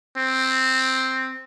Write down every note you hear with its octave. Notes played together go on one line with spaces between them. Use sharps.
C4